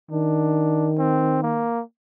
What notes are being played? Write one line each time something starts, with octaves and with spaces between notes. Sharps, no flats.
D#3 D4
C4
A#3